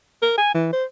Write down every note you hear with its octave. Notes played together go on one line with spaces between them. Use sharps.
A#4
G#5
E3
C5